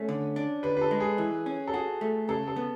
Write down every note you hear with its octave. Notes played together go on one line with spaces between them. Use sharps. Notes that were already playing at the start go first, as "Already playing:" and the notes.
Already playing: A3 C#4
D3
D4
D3 B4
B4
A4
G#3
G#4
E3
C#4
A4
F#4 G#4
A3
C#3 A4
A4
B3